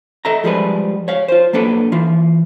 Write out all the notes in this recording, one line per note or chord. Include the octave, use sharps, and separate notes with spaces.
A4 D#5 E5 A#5
F3 G3 G#3 G#4 B4
C#5 F5
F4 C5
F#3 A#3 D4 A4 B4
E3 F4